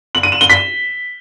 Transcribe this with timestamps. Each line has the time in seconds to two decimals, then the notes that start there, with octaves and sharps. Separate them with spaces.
0.15 F#7
0.23 D#7
0.32 E7
0.41 G7
0.50 B6